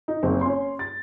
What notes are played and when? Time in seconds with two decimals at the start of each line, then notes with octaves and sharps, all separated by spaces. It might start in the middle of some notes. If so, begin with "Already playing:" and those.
0.08 D#4
0.23 F#1 C4
0.41 C#4 C6
0.79 A6